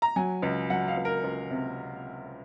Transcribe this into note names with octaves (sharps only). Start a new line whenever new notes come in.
A#5
F#3 G#5
C#2
F#3 F#5
F5
C#2
A#4
C#2
C3